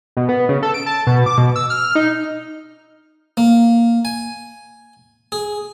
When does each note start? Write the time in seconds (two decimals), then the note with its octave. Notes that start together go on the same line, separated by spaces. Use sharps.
0.17 B2
0.29 B3
0.49 C#3
0.63 A4
0.74 D7
0.86 A5
1.07 B2
1.26 D6
1.38 B2
1.56 E6
1.70 F6
1.95 D#4
3.37 A#3
4.05 G#5
5.32 G#4